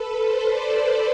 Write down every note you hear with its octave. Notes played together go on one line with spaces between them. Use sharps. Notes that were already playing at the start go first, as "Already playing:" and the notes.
Already playing: A4 B4
C5
D5